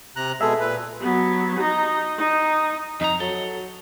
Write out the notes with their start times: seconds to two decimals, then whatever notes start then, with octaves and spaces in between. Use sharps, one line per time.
0.16 C3 A#5 F#6
0.41 B2 G#3 G#4 A4 E5
0.60 A#2 B4
1.01 F#3 B3
1.60 D#4 A#5
2.18 D#4
3.01 F2 D#4 A#5
3.20 F#3 A4